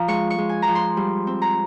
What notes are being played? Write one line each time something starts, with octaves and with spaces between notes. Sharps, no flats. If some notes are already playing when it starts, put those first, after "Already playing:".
Already playing: F3 F5 A#5
G#3 C#6
C#6
G#3
G#5
A#5
F3
C6
G3
C4
A#5